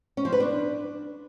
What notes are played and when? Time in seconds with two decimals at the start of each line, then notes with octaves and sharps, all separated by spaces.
0.17 C#4
0.25 F3
0.32 B4
0.40 D4